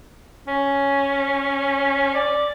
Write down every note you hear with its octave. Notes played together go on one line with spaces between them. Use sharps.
C#4
D5